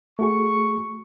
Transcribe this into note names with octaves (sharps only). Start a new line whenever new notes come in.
A3 F#4 G#4 C#6